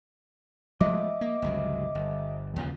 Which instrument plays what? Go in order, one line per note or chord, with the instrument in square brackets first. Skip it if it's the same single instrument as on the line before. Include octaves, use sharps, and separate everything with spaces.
[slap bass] F3 G#3 A3 [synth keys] D#5 E5 D6
[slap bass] A#3
G1 C#2 F#3
G1
D#2 C#3 F3